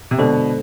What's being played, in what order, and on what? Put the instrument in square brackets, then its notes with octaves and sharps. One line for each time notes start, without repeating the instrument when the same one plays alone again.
[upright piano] C3
[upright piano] B2 D3 [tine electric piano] G#3 D4 A4 C5